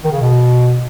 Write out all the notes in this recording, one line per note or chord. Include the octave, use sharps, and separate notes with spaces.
D#3
C#3
B2